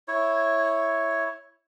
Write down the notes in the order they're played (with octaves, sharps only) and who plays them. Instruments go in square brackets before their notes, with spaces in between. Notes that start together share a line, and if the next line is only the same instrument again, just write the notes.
[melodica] E4 C#5